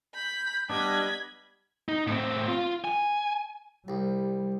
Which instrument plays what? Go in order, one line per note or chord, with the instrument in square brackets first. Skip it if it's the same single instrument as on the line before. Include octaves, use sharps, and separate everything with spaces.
[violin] B5 [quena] G6
[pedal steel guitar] G3 B3 D4 [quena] D#5 [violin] B5 G#6
[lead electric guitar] D#4
A2 C4
F4
G#5
[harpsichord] C2 [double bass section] G3